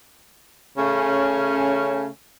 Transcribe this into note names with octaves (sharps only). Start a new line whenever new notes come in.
C#3 A3 C#4